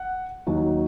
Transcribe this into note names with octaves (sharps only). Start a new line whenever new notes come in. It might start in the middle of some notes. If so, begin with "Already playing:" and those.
Already playing: F#5
D#2 D#3 F#3